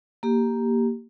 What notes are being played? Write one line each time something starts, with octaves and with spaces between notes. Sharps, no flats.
A#3 G4